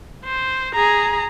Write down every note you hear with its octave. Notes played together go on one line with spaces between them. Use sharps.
C5
G#4 A#5